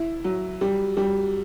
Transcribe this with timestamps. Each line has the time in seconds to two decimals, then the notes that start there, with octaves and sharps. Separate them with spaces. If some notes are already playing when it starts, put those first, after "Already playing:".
Already playing: E4
0.24 F#3
0.61 G3
0.97 G3